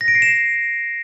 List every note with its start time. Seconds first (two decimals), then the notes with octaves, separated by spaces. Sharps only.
0.01 A#6
0.08 D7
0.15 C7
0.22 E7